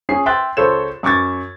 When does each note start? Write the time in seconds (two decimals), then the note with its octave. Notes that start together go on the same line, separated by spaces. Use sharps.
0.09 C#4 G#4 C7
0.26 E5 G5 C6 F#6 A6
0.57 C#2 A4 C5 C#5 E7
1.03 F#2 C#6 D6 G#6 A6